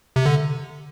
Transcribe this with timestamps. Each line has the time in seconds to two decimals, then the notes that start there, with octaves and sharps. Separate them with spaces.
0.16 C3
0.26 D3